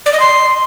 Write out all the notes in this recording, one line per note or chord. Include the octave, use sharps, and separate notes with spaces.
D5
D#5
C6